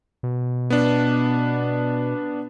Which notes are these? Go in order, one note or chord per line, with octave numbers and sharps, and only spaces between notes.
B2
B3 D4